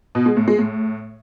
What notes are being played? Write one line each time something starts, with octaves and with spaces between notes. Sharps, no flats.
B2
G#3
A2
G#3
A2